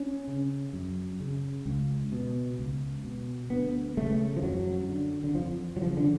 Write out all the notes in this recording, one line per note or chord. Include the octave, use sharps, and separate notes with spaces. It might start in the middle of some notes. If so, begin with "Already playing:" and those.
Already playing: C#4
C#3
F#2
C#3
C#2
B2
C#2
B2
D2 B3
C#3 A3
F3
F#2 F#3
D3
D3
F2 F3
F#3
C#3 F3
D3